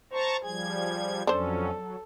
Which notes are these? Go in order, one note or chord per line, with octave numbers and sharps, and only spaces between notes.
C5 A5 A#5 C#6
F3 G3 G#4 G#6
F2 F#3 C#4 D4 A4 C5
F#3